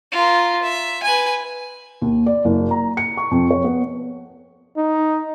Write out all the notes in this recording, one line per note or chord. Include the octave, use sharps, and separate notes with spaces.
F4 A#4
E5
B4 G#5
D#2
D5
F#1
A#5
C#7
C#6
F2
C#5
B3
D#4